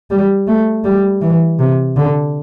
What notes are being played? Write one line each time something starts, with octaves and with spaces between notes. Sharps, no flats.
G3
A3
G3
E3
C3
D3